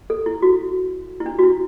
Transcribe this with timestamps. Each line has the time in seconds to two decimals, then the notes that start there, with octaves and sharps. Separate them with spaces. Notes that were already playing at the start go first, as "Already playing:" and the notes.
0.10 A4
0.26 E4
0.42 F#4
1.20 E4
1.26 D4
1.39 F#4
1.43 E4